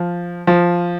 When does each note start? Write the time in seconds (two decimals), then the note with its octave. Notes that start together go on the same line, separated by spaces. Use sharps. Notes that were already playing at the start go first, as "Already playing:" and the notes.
Already playing: F3
0.47 F3